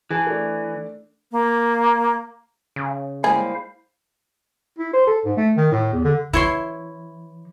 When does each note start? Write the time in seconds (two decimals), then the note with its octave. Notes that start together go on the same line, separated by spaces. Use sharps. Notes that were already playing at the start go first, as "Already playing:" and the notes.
0.11 E3 G#4 A5
0.27 A3 D4
1.31 A#3
2.76 C#3
3.24 G3 G#3 A#3 E4 G#4 C5 F5
4.78 E4
4.93 C5
5.07 A4
5.25 G#2
5.37 A3
5.57 D#3
5.72 A2
5.93 E2
6.04 D3
6.33 E3 E4 C#5 C6